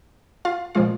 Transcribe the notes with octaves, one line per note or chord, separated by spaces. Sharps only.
F4 F5
A#2 F3 G#3 F4 F5